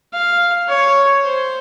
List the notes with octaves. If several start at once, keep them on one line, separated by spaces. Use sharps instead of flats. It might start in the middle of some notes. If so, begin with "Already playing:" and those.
F5
C#5
C5